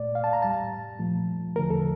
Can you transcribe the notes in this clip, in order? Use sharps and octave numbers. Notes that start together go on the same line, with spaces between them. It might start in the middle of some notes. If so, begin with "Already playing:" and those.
Already playing: A#2 A3 D5
F5
A5
A#5
A2 G3 A5
A#2 F3 A3
E2 D3 F3 A3 A#4
A4